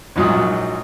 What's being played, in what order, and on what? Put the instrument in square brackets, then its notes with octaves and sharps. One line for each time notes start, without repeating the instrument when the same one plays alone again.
[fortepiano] A#1 G#2 F#3 F4 D#6